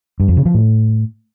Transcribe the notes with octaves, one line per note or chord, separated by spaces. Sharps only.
G2
F2
C#3
F3
A2